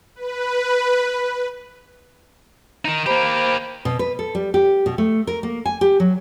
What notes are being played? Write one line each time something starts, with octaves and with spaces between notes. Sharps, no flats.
B4
D#3 D#4
A#3 G4 C5 A#5 B5
B2
B4
A4
G3
G4
B2
A3
A#4
A#3
G#5
G4
F#3